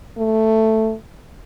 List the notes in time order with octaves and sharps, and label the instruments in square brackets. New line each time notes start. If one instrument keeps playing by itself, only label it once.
[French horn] A3